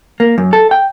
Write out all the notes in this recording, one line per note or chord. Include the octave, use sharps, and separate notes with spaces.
A#3
F#2
A4
G5